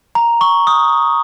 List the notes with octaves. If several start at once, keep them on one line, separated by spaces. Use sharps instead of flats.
A#5
C#6
D#6